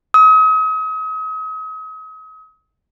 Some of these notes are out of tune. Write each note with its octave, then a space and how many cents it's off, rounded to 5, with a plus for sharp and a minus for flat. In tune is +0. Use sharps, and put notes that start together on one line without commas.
D#6 +40